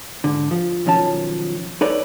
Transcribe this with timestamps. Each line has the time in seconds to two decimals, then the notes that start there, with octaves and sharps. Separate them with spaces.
0.24 G#2 D3
0.51 F3
0.86 B1 D#3 F3 C#4 A5
1.81 D#4 A4 B4 C#5 D5